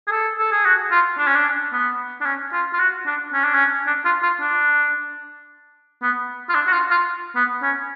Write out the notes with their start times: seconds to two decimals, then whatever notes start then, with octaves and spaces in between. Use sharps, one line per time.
0.08 G#4
0.11 A4
0.39 A4
0.52 G#4
0.65 F#4
0.92 F4
1.18 D4
1.28 C#4
1.36 D4
1.73 B3
2.21 D4
2.26 C#4
2.53 F4
2.74 F4
2.79 F#4
3.07 D4
3.34 C#4
3.44 D4
3.54 C#4
3.87 D4
4.05 F4
4.23 F4
4.41 D4
6.02 B3
6.49 F4
6.55 D4
6.67 F#4
6.73 F4
6.91 F4
7.36 B3
7.63 C#4